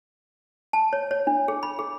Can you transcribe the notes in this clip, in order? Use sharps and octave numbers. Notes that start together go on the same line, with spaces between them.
A5
C#5
C#5
D4
G#4
B5
G#4